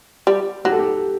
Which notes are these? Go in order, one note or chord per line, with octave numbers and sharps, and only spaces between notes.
G3
F#3 G4
A4
G4